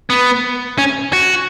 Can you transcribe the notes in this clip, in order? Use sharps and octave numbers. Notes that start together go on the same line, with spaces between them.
B3
C#4
F#4